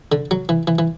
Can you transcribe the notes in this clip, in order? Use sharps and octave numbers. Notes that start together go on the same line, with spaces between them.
D3
F#3
E3
E3
E3